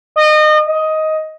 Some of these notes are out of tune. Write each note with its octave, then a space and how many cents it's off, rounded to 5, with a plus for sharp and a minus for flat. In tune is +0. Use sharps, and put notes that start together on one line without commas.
D#5 -30
D#5 +10